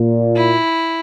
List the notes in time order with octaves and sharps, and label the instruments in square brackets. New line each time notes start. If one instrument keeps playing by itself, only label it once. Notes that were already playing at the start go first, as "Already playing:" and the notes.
Already playing: [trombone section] A#2
[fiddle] E4